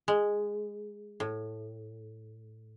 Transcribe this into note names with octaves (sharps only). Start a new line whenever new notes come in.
G#3
A2